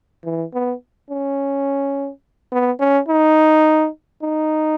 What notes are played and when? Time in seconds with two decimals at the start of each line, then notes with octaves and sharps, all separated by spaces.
0.24 E3
0.54 B3
1.10 C#4
2.52 B3
2.80 C#4
3.08 D#4
4.22 D#4